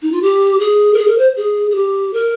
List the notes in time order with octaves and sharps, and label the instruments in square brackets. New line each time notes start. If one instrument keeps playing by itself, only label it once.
[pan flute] D#4
F4
G4
G#4
A#4
G#4
A#4
C5
G#4
G#4
G4
A#4